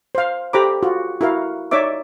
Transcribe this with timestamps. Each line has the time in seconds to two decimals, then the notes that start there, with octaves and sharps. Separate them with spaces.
0.15 C5 F5
0.53 G4 A4 C5 A#5 B5 D6
0.83 F4 F#4
1.21 E4 F#4 A#4 F5
1.71 D#4 C#5 D5 E5 D6